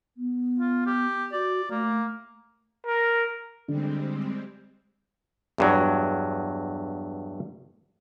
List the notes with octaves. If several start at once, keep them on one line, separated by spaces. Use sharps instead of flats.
B3
F4
G4
F#4 D5
A3 A#3
A#4
D3 G3 G#3 C4
E2 G2 F#3